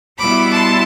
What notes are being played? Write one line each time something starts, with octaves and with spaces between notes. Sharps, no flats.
B2 G3 B3 E4 B5 D6
A5 C6